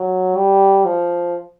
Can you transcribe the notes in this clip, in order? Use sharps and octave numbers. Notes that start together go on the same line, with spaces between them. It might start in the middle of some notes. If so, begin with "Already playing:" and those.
Already playing: F#3
G3
F3